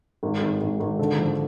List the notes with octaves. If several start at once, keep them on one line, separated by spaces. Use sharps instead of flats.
G#1
G#1
G#1
G#1
D3
F3